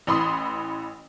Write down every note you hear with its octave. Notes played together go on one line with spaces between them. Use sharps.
A1 E3 B5 C6 D#6